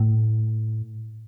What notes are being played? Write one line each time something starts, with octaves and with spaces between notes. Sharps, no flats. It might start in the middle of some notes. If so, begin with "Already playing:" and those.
Already playing: A2